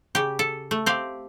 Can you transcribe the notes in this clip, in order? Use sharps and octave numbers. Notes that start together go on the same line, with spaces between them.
C#3 G4
A4
A3
C4 G4 F5